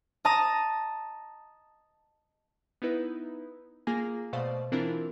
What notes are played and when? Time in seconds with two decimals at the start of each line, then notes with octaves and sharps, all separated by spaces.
0.25 D#5 A5 A#5 D#6
2.82 B3 D#4 E4 B4
3.87 A#3 F4 G#4 G#5 A#6
4.33 B2 A3 C5 D5 F5 D#6
4.72 E3 C4 D4 E4 F4 A#4